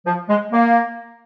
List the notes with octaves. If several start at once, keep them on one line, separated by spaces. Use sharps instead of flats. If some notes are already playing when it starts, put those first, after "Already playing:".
F3
G#3
A#3